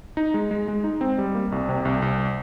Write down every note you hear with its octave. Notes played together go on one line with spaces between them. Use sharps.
D#4
G#3
G#3
G#3
D#4
C4
G3
A#3
C2
C3
C2
C2